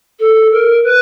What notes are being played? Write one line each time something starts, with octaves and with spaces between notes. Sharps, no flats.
A4
A#4
B4